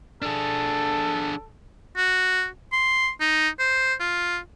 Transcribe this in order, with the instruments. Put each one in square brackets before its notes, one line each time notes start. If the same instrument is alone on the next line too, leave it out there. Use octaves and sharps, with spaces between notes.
[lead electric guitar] D4 G#4 [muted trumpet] A4
[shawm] F#4
C6
D#4
C5
F4